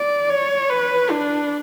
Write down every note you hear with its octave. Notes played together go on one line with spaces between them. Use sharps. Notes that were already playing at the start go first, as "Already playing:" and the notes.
Already playing: D5
C#5
B4
D4